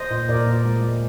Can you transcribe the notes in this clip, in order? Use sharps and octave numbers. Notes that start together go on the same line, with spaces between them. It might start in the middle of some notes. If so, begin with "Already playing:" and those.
Already playing: C5 D#5
A#2
A#2 A#4 D5
A#2
G#3
G#3